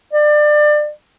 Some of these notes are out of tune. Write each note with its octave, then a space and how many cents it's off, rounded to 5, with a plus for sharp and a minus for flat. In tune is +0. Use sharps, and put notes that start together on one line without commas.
D5 +25